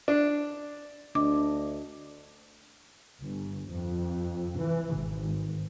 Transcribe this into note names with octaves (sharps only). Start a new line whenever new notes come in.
D4
D2 D4 D#5 D6
G1
F2
E3
G#1